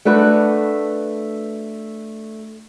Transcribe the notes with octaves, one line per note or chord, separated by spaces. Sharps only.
A3 D4 F#4 B4